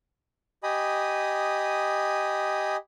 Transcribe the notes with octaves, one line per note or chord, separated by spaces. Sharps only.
G4 D#5 G#5 B5 D#6